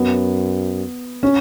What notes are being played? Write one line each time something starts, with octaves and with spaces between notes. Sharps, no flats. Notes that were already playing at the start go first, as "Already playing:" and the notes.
Already playing: F#2 B3
C#4